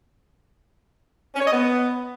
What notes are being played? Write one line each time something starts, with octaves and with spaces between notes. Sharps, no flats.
C#4
C#5
D#5
B3